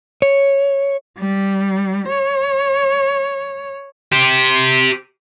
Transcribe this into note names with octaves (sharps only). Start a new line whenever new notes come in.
C#5
G3
C#5
G4 C5